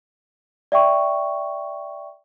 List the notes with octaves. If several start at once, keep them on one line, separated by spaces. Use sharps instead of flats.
D5 E5 G5 C#6